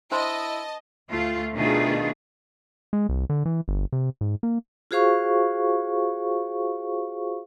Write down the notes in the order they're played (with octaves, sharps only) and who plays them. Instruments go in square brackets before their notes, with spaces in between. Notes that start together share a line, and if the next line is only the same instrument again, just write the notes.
[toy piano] D4 C5 C6 [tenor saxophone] E4 [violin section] D#5 [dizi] A5
[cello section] D2 A3 F4
B2 D#3 A3 D4 F4 G#4
[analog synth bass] G#3
C2
D3
E3
G1
C3
G#2
A#3
[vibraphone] F4 F#4 G#4 C5 F5 C#6